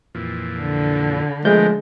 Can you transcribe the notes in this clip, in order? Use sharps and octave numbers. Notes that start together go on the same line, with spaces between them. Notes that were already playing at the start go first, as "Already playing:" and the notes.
F2 A#2 E3
D3
F3 G#3 A3 B3 D4 A#4 G6